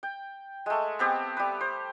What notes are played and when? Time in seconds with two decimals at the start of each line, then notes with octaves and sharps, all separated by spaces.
0.03 G5
0.66 G#3 A3
0.99 B3 C4 G4
1.37 G3 B4
1.61 C5